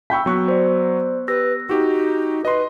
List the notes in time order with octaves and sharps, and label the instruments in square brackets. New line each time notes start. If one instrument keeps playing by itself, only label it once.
[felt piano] G5 B5 E6 [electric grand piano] C#6 G6 B6
[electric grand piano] F#3 C#6 F#6 [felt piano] B3
[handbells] C5 D5
[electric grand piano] G4 [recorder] B4 [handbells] E6 A#6
[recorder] D#4 [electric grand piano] F#4 G4
[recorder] B4 [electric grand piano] D#5 C6